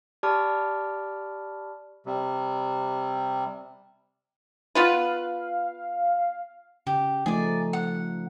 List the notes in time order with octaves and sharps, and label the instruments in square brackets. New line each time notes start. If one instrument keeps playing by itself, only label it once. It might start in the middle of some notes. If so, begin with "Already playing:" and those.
[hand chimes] G4 D5 A5 B5 D6 F6
[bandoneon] C3 G3
[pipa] B3 F4 B4 [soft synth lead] F5
[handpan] C#3 [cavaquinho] G4
[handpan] F3 A3 D#4 [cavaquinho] G#4 D5
[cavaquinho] F#5